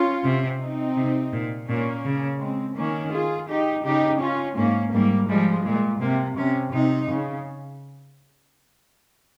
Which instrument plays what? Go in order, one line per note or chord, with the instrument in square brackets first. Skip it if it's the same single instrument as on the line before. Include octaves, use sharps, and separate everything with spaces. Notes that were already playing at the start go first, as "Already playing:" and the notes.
Already playing: [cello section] C#4 F4
[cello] C3
[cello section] C4 D#4
[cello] C3
A#2
[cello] A#2 [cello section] A#3 C#4
[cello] C#3
[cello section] G#3 C4
[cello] D#3 [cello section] A#3 C#4
[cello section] F4 G#4
D#4 G4
[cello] C#3 [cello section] D#4 G4
[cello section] C#4 F4
[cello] G#2 [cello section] A#3 C#4
[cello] G#2 [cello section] G3 A#3
[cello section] F3 G#3 [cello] G3
[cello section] A#2 [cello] G#3
[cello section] C3 [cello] A#3
[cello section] C3 [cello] C#4
[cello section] C3 [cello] D#4
[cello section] C#3